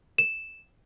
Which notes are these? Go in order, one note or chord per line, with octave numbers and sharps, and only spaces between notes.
E7